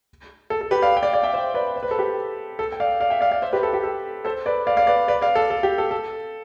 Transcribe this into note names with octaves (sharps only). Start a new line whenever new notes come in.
A4
A4
G4 B4
D5 F5
G5
D5 F5
D5 F5
E5 G5
C5 E5
B4 D5
C5
B4
A4
G4 B4
A4
G5
D5 F5
D5 F5
E5 G5
D5 F5
D5 F5
C5 E5
G4 B4
A4
G4
A4
A4 C5
B4 D5
D5 F5
D5 F5
B4 D5
B4 D5
D5 F5
A4
A4
G4
A4
A4